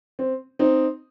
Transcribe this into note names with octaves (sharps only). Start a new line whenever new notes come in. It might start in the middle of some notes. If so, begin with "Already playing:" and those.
C4
C4 D#4